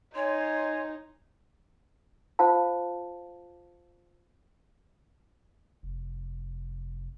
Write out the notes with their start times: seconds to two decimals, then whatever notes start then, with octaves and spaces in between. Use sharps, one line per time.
0.15 D#4 C#5 G#5 C6
2.39 F4 C5 F5 A5
5.83 F1